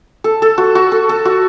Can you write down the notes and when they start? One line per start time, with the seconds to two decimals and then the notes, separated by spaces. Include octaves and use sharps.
0.24 A4
0.42 A4
0.58 F#4
0.75 F#4
0.92 A4
1.09 A4
1.25 F#4